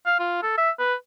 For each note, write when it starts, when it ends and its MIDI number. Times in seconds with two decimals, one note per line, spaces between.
0.06 0.16 77
0.20 0.42 65
0.43 0.57 69
0.57 0.71 76
0.79 0.94 71